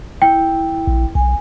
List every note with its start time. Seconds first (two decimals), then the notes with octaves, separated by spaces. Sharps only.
0.22 E4 G5
0.87 A#1
1.15 B1 G#5